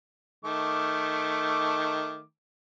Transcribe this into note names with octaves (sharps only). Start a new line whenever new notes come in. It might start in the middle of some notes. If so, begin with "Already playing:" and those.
D#3 A3 D6